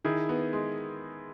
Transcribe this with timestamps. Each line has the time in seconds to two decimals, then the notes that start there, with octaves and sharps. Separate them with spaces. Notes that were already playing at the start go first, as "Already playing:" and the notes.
0.05 D#3 E4 G#4
0.29 B3
0.53 G#3